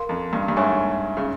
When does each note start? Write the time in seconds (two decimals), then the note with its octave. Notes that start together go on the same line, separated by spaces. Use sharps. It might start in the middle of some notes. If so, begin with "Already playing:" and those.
Already playing: A#4 F5 C6
0.09 F2
0.33 G2
0.48 G2
0.57 G#2 C#5 E5 G#5 C#6
1.17 C#3